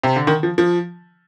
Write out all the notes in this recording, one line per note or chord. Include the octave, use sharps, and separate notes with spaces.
C3
D3
D#3
F3
F3